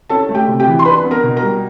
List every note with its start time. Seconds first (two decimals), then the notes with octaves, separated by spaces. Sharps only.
0.10 C#4 A4 A5
0.29 A3
0.35 G4 G5
0.47 C3
0.60 G4 G5
0.67 E3
0.79 C6
0.85 D4 B4 B5
1.04 B3
1.11 A#4 A#5
1.23 B2
1.36 A#4 A#5
1.42 G3